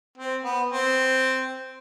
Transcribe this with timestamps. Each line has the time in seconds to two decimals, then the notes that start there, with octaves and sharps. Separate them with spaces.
0.18 C4
0.44 B3
0.71 C4